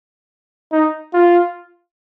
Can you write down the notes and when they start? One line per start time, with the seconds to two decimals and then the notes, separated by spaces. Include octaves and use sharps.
0.72 D#4
1.14 F4